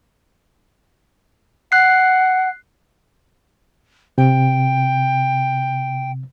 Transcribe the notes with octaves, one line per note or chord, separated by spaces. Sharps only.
F#5 F#6 C7
C3 G5